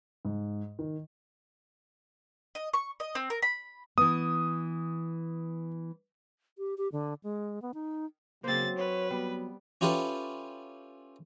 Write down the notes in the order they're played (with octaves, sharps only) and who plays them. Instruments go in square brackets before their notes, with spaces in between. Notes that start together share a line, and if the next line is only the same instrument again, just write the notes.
[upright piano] G#2
D#3
[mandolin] D#5
C#6
D#5
C4
A#4
B5
[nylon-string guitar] E3 B3 [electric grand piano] D#6
[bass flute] G4
G4
D3
G#3
B3
D#4
[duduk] C#3 [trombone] F#3 [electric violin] A#3 A6 [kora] C4 C5
[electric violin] B4 [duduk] C#5
[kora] G3 [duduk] B3
[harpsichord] C#4 E4 F4 G4 A4 B4